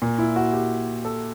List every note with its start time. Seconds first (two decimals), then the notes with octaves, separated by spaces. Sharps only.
0.02 A#2
0.18 E4
0.36 F#4
0.53 G4
1.05 A4